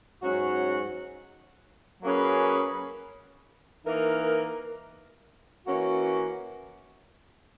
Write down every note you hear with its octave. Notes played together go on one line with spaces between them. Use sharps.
G#2 F#3 C#4 F#4
F#3 A#3 C#4 G#4 B4
E3 A#3 D#4 A#4
E3 A#3 C#4 F#4